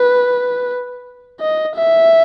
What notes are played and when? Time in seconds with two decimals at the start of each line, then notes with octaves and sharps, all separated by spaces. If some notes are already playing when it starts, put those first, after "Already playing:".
Already playing: B4
1.40 D#5
1.76 E5